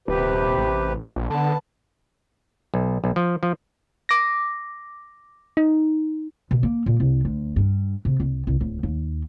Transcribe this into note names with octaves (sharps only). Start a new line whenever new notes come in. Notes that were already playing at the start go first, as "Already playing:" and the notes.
D#1 C3 G4 B4
A1
A#1
D3 B3 A5
B1
B1
F3
F3
D6 A#6
D#4
B2
A#3
A#2
C2
D2
G2
C3
C2
C2
D1
D#2